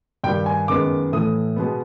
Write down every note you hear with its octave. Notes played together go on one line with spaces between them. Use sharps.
G2 D#3 G3 A#3 G5
G#5
F#2 D#3 G#3 B3 D6
A2 E3 A3 D#6
B2 G#3 B3